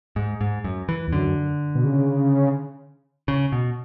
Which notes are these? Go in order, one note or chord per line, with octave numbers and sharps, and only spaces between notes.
G#2
G#2
F#2
E3
E2
F#2 D3
B2
C#3
C#3
B2